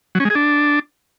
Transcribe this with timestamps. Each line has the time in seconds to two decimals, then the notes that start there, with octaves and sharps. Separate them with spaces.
0.15 F#3
0.20 C#4
0.25 G#3
0.30 G#4
0.35 D4